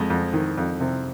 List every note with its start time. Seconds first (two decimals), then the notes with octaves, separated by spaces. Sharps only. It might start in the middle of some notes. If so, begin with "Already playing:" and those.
Already playing: F2 G#3
0.10 F2
0.33 D#3
0.57 F2
0.80 C3